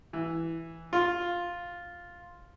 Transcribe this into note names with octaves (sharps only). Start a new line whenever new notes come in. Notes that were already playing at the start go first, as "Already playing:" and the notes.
E3
F4